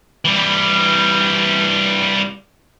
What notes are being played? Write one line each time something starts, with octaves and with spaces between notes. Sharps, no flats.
E3 G3